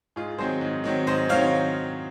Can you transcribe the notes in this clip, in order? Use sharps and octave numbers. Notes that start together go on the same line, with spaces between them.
G#2 F4 G#4
D#3 F#3 C4 G#4 C5
G#2
D#3 F#3 C4
G#2 C5 D#5
D#3 F#3 C4 C#5 F5